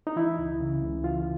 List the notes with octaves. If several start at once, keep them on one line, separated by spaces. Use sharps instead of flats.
D#4
E3 E4
C#2
C#3
C#2
E3 F4